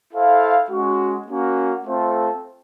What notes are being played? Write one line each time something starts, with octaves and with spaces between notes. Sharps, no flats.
E4 A4 C5 F5
G#3 C#4 F#4
A#3 C#4 F#4
A3 C4 F4 A4 C5